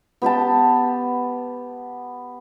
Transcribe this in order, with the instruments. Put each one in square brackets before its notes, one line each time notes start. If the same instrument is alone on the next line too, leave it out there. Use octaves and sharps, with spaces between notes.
[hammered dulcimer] B3 G4 G5 A5